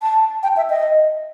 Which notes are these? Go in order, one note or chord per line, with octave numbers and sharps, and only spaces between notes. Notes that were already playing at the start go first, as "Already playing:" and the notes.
A5
G5
E5
D#5